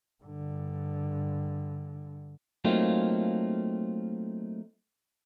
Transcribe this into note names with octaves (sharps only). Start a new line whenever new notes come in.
G2 D3
F#3 A3 A#3 C4 D#4 F4